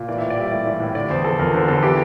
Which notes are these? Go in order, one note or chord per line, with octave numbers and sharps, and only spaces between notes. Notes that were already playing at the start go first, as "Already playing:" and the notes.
Already playing: A#2
E3 D5
E5
A2
D5
G3 E5
A2 D5
E3
A2
D3 D5
E2 C5
F3 A4
E2 A#4
D3 C5
E2 A4
E3 G4